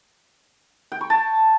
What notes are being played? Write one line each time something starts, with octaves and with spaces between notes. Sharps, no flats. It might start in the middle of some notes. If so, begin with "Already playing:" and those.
G5
C#6
A5